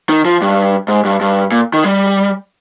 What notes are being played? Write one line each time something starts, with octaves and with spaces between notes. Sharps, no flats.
D#3
F3
G2
G#2
G2
G2
A#2
D#3
G3